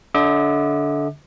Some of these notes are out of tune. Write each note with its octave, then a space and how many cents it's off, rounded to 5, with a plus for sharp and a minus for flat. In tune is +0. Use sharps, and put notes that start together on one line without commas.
D3 -20 E5 -45 D6 +25